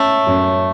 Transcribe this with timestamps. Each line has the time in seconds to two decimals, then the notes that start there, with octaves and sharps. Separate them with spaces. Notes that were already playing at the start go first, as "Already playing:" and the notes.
Already playing: A3 C#4
0.27 F#2